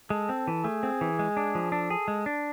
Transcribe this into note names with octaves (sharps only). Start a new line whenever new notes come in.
G#3 A4
C4
E3
A3 G#4
C4
E3
G#3
D4
F3
D4 A4
G#4
G#3
D4